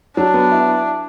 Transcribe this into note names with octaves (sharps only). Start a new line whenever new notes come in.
F#3 D4
B3
E4